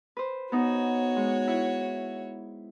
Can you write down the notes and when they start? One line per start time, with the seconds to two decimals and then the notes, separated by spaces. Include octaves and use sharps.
0.17 B4 C5
0.52 B3 D#4 F#4 C#5
1.16 G#3
1.48 E4